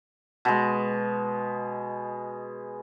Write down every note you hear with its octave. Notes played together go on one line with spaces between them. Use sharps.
B2 G#3